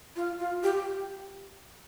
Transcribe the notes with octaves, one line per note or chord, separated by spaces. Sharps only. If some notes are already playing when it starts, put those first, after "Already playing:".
F4
F4
G4